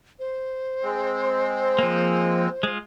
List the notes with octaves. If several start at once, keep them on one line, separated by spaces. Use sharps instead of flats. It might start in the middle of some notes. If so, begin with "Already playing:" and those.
C5
G#3 C4
F3 A#3
G#3 F4